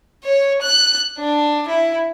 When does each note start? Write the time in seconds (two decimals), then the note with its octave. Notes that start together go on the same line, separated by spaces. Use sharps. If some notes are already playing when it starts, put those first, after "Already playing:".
0.24 C#5
0.61 F#6
1.19 D4
1.68 E4